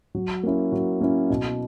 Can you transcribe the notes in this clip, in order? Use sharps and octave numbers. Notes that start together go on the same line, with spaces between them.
F#3
A#3 C#4 E4
F#3
A#3 C#4 E4
B2